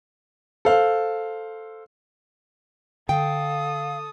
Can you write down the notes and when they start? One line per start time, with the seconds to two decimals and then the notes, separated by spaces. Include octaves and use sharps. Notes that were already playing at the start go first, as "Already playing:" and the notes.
0.65 A4 C5 F5
3.09 D3 A4 F5 G5 D#6